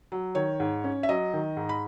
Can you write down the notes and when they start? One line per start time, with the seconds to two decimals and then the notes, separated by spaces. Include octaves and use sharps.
0.12 F#3
0.35 D#3 C#5
0.60 G#2
0.84 C#4
1.03 E5
1.09 F#3 D#5
1.33 D#3
1.57 G#2
1.69 B5